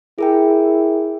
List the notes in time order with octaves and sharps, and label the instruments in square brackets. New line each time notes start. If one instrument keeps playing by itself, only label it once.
[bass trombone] E4 [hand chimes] G#4 A#4 G5